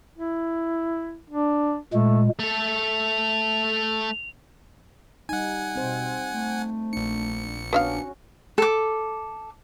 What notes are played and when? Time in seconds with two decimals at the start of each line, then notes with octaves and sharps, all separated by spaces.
0.18 E4
1.30 D4
1.93 A#2 G#3 A3
2.39 A3 A4 F7
5.29 G3 D#4 F#5 G#5
5.76 B2 C4 C5
6.32 A3
6.93 A#1 D4 C#7
7.73 B3 C#4 D4 F#4 E5 F5
8.58 A4 D6